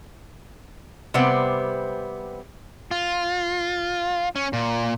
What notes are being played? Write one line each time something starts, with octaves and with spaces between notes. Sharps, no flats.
C3 G3 B3 C4
F4
C#4
A#2